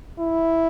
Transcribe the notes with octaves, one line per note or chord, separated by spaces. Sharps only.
E4